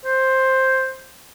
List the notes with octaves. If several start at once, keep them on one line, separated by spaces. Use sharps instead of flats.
C5